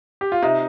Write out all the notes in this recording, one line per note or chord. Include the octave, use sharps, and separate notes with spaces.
G4
F4
C3 D#4